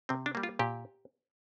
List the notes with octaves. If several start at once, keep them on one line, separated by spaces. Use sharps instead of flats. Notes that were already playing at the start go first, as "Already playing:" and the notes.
C3 C4
D4
G3 A#3
F4
A#2 G4